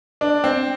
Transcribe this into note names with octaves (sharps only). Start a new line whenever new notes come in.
D4
C4